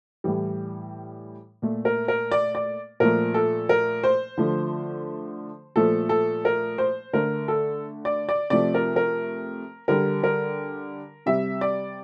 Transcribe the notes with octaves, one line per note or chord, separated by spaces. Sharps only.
A2 E3 G3
A#2 A3
A#4
A#4
D5
D5
A#2 F3 A3 A#4
A4
A#4
C5
D3 F3 A3
A#2 F3 A3 A4
A4
A#4
C5
D3 A3 A#4
A4
D5
D5
C3 F3 A3 D5
A#4
A#4
D3 G3 A#4
A#4
C3 G3 E5
D5